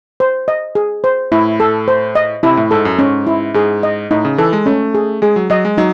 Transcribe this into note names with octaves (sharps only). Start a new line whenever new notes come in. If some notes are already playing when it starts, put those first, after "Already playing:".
C5
D#5
G#4
C5
A2 E4
A4
C5
D#5
C3 E4
A2
G#2 A4
F#2
G#2 C#4
E4
G#2 G#4
D#5
A2 D#4
C#3
E3 A4
G#3
A3 C#4
G#4
G#3 G#4
F#3
F#3 D#5
G#3
F#3 D#4